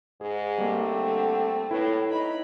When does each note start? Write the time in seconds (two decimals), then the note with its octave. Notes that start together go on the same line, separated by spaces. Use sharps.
0.21 G#2 G#4
0.58 G3 A3 A#3 C4
0.92 D3
1.71 A2 E4 B4 C#5
2.11 D#4 B5